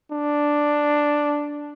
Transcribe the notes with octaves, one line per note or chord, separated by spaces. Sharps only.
D4